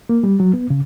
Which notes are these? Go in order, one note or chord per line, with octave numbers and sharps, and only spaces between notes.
A#3
G3
F#3
B3
C#3